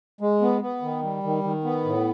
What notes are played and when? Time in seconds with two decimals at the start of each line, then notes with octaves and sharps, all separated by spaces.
0.21 G#3
0.41 B3
0.61 B3
0.82 D#3
1.03 G3
1.23 D#3
1.44 D#3
1.64 B3
1.85 A2